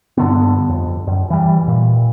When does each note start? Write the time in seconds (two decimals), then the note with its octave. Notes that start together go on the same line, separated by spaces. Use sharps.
0.17 G2 D3 B3
0.69 F2
1.07 F#2
1.30 E3 G3
1.68 A#2